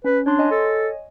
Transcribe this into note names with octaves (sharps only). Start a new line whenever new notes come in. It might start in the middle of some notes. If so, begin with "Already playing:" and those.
C#4 B4
D4 C#5 C6
C#5 D#5 G#5
A4